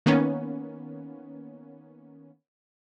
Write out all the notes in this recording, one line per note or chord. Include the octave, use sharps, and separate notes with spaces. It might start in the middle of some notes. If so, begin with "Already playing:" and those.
D#3 A#3 B3 C#4